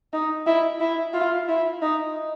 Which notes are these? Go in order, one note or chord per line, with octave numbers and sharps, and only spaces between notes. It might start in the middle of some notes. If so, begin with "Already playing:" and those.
D#4
E4
E4
F4
E4
D#4